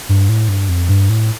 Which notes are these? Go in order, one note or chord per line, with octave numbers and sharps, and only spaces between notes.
G2
A2
G2
F2
G2
A2